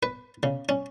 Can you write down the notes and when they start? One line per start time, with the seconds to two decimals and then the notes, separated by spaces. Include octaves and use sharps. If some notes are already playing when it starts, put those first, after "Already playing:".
0.03 B4
0.43 C#3
0.69 C#4